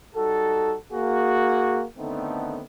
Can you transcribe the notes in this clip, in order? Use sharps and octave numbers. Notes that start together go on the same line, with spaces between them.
G3 D#4 F#4 A4
A#3 F#4 G#4
D3 D#3 A3 B3 C4 D#4